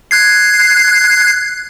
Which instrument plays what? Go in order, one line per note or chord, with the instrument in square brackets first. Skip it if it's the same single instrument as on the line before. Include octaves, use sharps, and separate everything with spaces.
[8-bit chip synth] F#6 G#6 C7